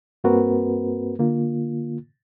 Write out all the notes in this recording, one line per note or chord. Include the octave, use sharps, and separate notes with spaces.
G2 A#3 C4 F#4 A#4 B4
D3 A#3 F4